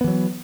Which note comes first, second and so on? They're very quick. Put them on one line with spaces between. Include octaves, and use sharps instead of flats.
B3 E3 F#3